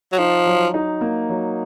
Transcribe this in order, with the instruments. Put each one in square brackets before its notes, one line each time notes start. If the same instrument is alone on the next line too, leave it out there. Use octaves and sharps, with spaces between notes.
[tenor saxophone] F#3
[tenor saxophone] F3 [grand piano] D#4
[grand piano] F#3
D#4
A#3
F#3